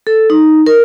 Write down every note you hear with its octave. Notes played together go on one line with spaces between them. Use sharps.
A4
D#4
A#4